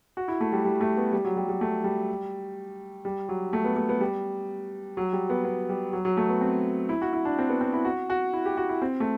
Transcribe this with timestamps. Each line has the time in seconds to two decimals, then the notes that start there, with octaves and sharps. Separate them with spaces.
0.17 F#4
0.28 E4
0.41 A3
0.52 G3
0.65 G3
0.81 A3
0.97 B3
1.13 G3
1.25 F#3
1.37 G3
1.49 G3
1.61 A3
1.84 G3
3.05 G3
3.29 F#3
3.53 A3
3.64 B3
3.76 A3
3.89 B3
4.01 G3
4.97 F#3
5.13 G3
5.30 B3
5.45 B3
5.69 G3
5.93 F#3
6.05 F#3
6.17 A3
6.29 B3
6.41 C4
6.89 E4
7.02 F#4
7.13 E4
7.25 D4
7.38 C4
7.49 B3
7.61 C4
7.73 E4
7.85 F#4
8.10 F#4
8.33 E4
8.45 G4
8.57 F#4
8.69 E4
8.82 C4
9.00 A3